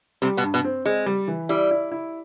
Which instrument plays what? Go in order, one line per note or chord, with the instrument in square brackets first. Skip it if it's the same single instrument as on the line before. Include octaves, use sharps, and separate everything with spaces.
[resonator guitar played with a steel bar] C3 C4 [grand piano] G3
[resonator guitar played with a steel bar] B2 B3
[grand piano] G2
[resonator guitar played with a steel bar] B2 B3
[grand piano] C4
[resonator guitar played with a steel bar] G#3 [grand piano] C4
[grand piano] G3
E3
[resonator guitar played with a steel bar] G3 [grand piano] E4
[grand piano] E4
E4